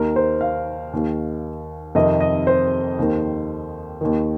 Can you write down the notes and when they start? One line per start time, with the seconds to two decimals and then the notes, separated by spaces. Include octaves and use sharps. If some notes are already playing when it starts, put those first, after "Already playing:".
Already playing: D#2 D#3 A#4
0.16 C5
0.41 F5
0.93 D#2 D#3
1.95 F2 C3 D#3 D#5
2.20 D#5
2.47 C5
2.99 D#2 D#3
4.01 D#2 D#3